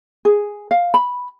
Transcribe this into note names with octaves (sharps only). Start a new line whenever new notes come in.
G#4
F5
B5